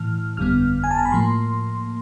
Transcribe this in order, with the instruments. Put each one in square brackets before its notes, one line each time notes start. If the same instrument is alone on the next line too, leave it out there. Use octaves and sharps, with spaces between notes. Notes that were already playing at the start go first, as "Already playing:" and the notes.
Already playing: [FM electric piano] A2 E3 F6
G1 F2 D3 G3 B3 F6
G#5
A5
A#5
B5
A2 F3 A#3 C6